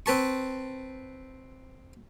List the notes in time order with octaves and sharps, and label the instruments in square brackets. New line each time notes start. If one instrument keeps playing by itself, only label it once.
[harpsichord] C4 B4 A5 C#6